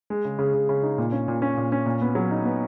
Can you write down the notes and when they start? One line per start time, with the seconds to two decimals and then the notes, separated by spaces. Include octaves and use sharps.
0.10 G#3
0.25 C#3
0.39 C#3
0.54 C#3
0.69 C#3
0.83 D#4
0.98 A#2
1.12 C#4
1.28 A#2
1.42 C#4
1.57 A#2
1.72 C#4
1.86 A#2
2.02 B3
2.15 F#3
2.31 D#4
2.45 B3